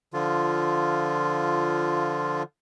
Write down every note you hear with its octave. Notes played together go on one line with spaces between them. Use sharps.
D3 F3 F4